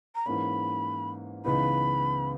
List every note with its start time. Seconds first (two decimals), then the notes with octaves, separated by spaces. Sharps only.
0.15 A#5
0.26 G#2 E3 A#3 C#4 B5
1.45 C#2 C#3 E3 B3 D#4 B5